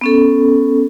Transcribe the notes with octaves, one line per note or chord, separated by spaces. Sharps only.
B3 C#4 A4